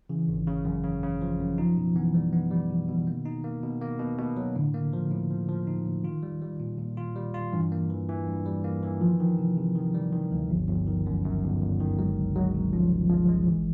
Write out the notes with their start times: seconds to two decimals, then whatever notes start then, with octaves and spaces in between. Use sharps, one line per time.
0.09 C#3 E3
0.28 G#1
0.47 C#3
0.65 F#2
0.84 C#3
1.03 C#3
1.21 F3
1.39 F#2
1.58 F3 D#4
1.76 B2
1.95 E3 B3
2.14 G3
2.33 B3
2.51 G3
2.70 B2
2.89 B2
2.98 E3
3.07 D#3 A#3
3.26 D#4
3.44 A#3
3.63 B2
3.81 A#3
4.00 B2
4.18 B2
4.37 F#3
4.56 A2 D3
4.74 A#3
4.93 F3
5.11 A2
5.30 F3
5.49 F3
5.67 D#4
5.86 A2
6.04 D#3 F4
6.23 G3
6.42 G3
6.60 A#2
6.78 A#2
6.97 F4
7.16 G3
7.34 F4
7.53 G2 E3
7.72 A#3
7.90 E3
8.09 E3
8.28 G2
8.46 G3
8.64 A#3
8.83 E3
9.01 D#3 F3
9.20 D#3
9.39 C3
9.57 C3
9.76 D#3
9.94 G3
10.13 D#3
10.32 D2
10.50 G1 F3
10.69 G1
10.87 D#3
11.06 F#2
11.25 F#2
11.43 G1
11.61 G1
11.80 D#3
11.99 F#3 G#3
12.17 C#2
12.35 F#3 G#3
12.54 B2
12.73 F3 C#4
12.92 C#2
13.10 F3 G#3
13.29 G#3
13.47 G#1 E3